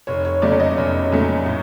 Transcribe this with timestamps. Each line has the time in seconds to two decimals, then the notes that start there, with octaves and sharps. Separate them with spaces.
0.07 F1 C#5
0.25 C#5
0.42 E2 C#3 F#3 A3 D5
0.60 D#5
0.77 F1
1.12 E2 C#3 F#3 A3
1.46 A2